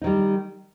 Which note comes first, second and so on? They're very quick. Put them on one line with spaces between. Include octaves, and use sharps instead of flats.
D#4 D#3 G3